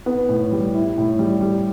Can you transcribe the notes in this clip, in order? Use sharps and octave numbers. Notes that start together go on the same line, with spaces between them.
B3
A2
G3
E4
A2
G3
G3